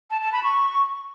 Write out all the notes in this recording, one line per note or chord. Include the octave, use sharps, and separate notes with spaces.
A5
A5
B5
C#6